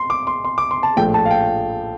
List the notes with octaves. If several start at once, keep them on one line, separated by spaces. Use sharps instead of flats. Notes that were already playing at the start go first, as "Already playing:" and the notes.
Already playing: C6
D6
C6
C6
D6
C6
A5
A#1 A2 F3 A3 G5
A5
F5
G5